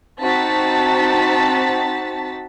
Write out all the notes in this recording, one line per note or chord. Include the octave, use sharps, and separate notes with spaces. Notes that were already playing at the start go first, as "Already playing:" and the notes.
C4 D#4 F#4 A5 A6 B6